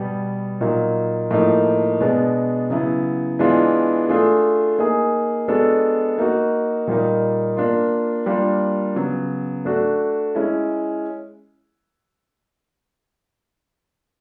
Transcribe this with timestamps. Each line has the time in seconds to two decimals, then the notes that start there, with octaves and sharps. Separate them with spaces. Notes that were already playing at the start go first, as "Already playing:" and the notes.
Already playing: B2 G3 B3
0.61 A#2 F#3 A#3 D#4
1.31 A2 F3 A#3 D#4
2.00 B2 G#3 B3 D4
2.70 C#3 F#3 B3 E4
3.39 E3 G#3 B3 D4 F4
4.09 A3 D4 F4 G#4
4.79 A#3 D#4 G#4
5.48 G#3 B3 D4 F#4 A4
6.18 A#3 D#4 F#4
6.87 A#2 G3 A#3 D#4
7.57 A#3 D4 F4
8.26 G3 A#3 D4 F4 A#4
8.96 C#3 F#3 B3
9.65 A3 D4 F#4
10.35 G#3 C#4 E4